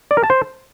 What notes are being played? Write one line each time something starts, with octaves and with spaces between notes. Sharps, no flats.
D5
A#4
A5
C5